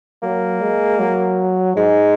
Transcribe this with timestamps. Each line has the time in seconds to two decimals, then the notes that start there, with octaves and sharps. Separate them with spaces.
0.23 F#3 A#3
0.61 G#3
0.99 F#3
1.76 G#2 G#3